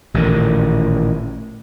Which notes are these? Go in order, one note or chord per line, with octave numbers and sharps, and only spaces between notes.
A1 A#2 D3 D#3